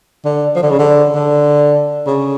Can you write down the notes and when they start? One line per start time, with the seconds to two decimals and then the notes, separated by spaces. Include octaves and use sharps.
0.24 D3
0.55 F3
0.62 D3
0.70 C#3
0.79 D3
1.15 D3
2.06 C#3